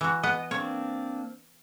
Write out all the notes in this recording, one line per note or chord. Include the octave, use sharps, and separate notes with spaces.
E3 F#4
B3 D#5 F#5
A#3 C4 D4 C#5